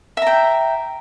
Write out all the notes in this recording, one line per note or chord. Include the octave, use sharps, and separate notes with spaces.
E5 G5 A#5